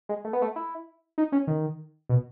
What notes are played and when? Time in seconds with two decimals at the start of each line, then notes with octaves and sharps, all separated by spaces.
0.09 G#3
0.25 A3
0.33 B3
0.42 A3
0.56 E4
1.18 D#4
1.32 C#4
1.47 D#3
2.09 B2